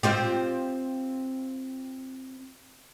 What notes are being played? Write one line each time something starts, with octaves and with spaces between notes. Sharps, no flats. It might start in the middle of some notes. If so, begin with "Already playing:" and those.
C4 F4 G4